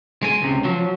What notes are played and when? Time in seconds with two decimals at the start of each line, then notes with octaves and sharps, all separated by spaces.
0.23 G#3 G#5
0.42 C#2 C3
0.64 F3 F#3